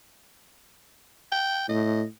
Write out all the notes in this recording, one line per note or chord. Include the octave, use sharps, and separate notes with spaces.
G5
A2 D#5